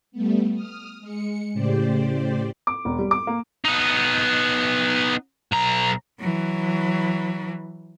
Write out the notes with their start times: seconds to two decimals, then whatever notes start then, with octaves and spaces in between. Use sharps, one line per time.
0.12 G3 A3 B3
0.53 D#6 F6
1.00 G#3 C#7
1.53 A2 C#3 G4 C5 D5
2.67 D6
2.85 E1
2.99 G3
3.11 D6
3.27 A#3
3.65 B3 D#4
5.53 B1 A#5
6.20 E3 F#3